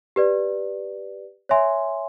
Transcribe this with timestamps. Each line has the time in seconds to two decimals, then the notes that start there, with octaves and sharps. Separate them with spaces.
0.16 G4 B4 D5
1.49 C#5 E5 G#5 C6